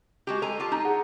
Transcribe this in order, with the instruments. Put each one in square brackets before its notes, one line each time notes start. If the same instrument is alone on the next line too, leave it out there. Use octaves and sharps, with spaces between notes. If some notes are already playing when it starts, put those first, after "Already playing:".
[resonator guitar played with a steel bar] G#3 F#4 G4
[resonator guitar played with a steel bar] G#3 G#5 A#5 [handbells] A4
[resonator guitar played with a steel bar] F4 G4 A5
D#4
[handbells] G#4 F#5